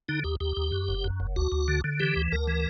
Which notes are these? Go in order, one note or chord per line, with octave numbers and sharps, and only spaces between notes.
D3 D#4
D#2 G4
D#2 G4
D#2
F#2
F#1
F#2
F#1
D2 F#4
D2
D3
D3
E3 G4
D2
D2 A#4
E3